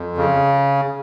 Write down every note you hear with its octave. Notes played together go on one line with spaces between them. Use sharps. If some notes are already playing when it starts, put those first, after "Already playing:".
Already playing: F2
C#3